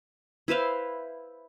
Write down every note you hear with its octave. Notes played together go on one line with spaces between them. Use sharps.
E4 B4 C5 F5